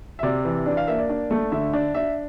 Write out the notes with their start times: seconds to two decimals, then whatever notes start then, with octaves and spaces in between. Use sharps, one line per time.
0.19 E5
0.23 C3 D5
0.45 E3
0.66 D4 D5
0.77 F5
0.87 A#3 E5
0.98 D5
1.09 D4
1.31 A3
1.52 D3 E5
1.73 D4
1.94 D4 E5